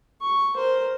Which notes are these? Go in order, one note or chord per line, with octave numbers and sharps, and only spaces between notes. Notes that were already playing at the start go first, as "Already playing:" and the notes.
C#6
A#4 C5